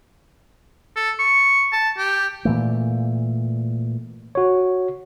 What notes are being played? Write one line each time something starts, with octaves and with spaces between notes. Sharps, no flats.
A4
C#6
A5
G4
A#2 E3 A3
F#4 C#5